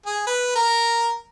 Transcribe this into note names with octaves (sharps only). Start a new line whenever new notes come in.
G#4
B4
A#4